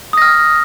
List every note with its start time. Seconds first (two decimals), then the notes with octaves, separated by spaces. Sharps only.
0.13 D#6
0.17 A#6
0.22 F6